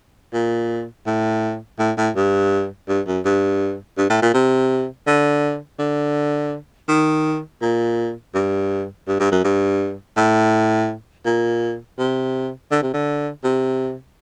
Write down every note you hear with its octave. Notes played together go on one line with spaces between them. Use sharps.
A#2
A2
A2
A2
G2
G2
F#2
G2
G2
A2
A#2
C3
D3
D3
D#3
A#2
G2
G2
G2
F#2
G2
A2
A#2
C3
D3
C3
D3
C3